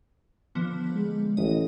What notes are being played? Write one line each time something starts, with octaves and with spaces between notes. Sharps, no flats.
D3 F3 B3
G#3
A1 D#5